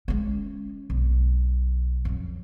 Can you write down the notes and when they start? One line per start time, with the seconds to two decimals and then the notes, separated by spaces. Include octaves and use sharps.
0.08 G#3 C#4
0.90 B1
2.05 F2 F#3